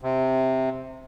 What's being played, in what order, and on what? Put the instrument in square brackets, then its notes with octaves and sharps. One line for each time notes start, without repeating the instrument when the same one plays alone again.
[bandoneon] C3